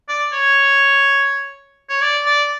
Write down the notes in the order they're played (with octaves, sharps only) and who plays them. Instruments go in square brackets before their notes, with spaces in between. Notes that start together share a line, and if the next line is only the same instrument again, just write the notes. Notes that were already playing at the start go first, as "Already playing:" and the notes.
[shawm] D5
C#5
C#5
D5
D5